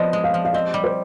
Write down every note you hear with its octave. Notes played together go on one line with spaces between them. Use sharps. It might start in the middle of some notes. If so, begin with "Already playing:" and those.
Already playing: F3 B3 C5 D5 D#5
G#3
F5
F3
F5
C4 D#5
G3
C5